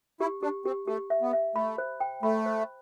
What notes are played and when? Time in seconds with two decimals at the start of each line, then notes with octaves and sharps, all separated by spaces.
0.20 E4 G4
0.42 D4 G4
0.65 C4 G4
0.87 A3 G4
1.10 E5
1.22 B3
1.33 E5
1.56 A3 B5
1.78 C5
2.00 G5
2.23 A3 B5
2.46 C5